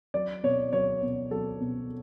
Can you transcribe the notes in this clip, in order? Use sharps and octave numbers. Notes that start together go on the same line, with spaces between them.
F#3 D5
B2 C#5
F#3 C#5
B2
F#3 A4
B2